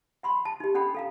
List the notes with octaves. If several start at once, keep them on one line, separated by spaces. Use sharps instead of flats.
F#5 B5 C6
A5
D#4 G4
C#4 D4 A4 F#5 G5 B5
A4 F5 A#5